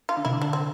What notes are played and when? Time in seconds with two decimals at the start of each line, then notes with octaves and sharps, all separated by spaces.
0.09 F4
0.17 D3
0.25 C3 E4
0.32 D3
0.42 D4
0.53 C4